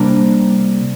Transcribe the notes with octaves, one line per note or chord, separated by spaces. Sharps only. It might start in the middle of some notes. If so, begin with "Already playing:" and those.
Already playing: C3 G3 A#3 D4